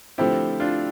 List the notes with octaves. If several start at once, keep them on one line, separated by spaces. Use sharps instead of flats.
D3 F3 A3 C4 E4 G4
D4 F4